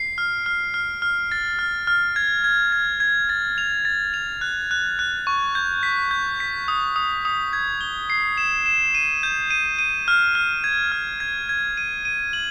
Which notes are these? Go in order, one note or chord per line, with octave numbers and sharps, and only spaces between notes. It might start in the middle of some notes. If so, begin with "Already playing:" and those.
Already playing: C7
F6
F6
F6
F6
A6
F6
F6
G#6
G#6
G#6
G#6
A6
F7
A6
F7
F#6
F#6
F#6
C#6
G6
B6
G6
B6
D#6
D#6
D#6
G#6
G7
C7
E7
E7
D#7
G6
D#7
D#7
F6
F6
G#6
F6
G#6
G#6
D#7
D#7
F#7